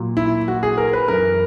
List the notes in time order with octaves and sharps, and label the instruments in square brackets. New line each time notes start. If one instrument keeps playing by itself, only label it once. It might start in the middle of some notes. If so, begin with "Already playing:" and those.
Already playing: [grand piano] A#2 F#3
E4
F#4
G#4
A#4
B4
F#2 E3 A#4